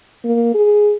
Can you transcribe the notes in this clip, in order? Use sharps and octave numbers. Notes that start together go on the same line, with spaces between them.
A#3
G#4